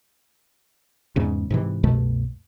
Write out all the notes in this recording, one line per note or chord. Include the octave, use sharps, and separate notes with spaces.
E2 G#2 C#3
G#2 C3 E3
C2 F#2 B2 A3